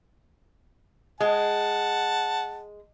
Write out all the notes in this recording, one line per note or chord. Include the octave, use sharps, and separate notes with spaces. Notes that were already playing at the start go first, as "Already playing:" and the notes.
G#3 F#5 A5